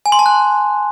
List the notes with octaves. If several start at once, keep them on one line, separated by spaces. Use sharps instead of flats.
G#5
C6
A5
F#6